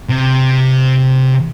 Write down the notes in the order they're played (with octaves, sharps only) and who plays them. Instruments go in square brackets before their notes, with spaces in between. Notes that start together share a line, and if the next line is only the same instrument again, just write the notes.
[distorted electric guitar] C3